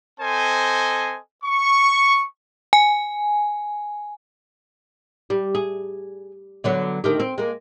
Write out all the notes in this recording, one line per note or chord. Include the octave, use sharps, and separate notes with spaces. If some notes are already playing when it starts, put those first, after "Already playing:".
C4 A4 C5 D#5 G#5
C#6
G#5
G3
G#4
D3 F#3 B3
D2 D#3 G4
C4
G#3 A#3